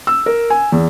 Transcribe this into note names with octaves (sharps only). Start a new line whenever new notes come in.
E6
A#4
G#5
E2